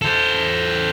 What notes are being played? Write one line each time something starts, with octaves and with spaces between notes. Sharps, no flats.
A4 C5